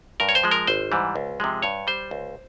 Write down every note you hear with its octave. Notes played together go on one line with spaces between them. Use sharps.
G2 A#4
C#5
C5
F3 G#3
A#4
G#1 C5
G#2 E3 G3
C#2
C3 F3 G#3
G2 C#5
G3 C5
C#2